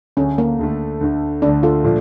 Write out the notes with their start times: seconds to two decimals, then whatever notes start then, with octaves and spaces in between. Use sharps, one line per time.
0.17 D2 D3 A3 C#4
0.38 A#3
0.59 D2 D3 A3
1.01 D2 D3 A3
1.42 D2 D3 A3 D4
1.63 F4 A4
1.84 A#2 F3 A3 D4